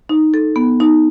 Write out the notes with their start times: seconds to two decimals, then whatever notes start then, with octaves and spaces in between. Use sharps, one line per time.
0.09 D#4
0.34 A4
0.56 B3
0.80 D#4